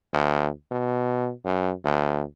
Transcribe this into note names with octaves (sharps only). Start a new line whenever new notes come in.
D2
B2
F#2
D2